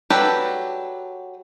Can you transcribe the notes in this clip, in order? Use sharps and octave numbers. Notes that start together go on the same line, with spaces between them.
F#3 G4 A4 B4 D5